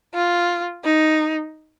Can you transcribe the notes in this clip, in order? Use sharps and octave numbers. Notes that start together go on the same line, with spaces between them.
F4
D#4